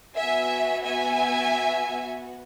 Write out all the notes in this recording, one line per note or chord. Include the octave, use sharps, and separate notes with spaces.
B3 F#4 E5 G#5
E5 G#5